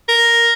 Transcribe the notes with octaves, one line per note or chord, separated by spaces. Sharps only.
A#4